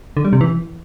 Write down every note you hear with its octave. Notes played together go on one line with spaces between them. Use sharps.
D3
G3
C3
E3